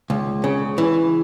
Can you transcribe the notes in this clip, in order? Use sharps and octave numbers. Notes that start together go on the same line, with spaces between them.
C#2
C#3
E3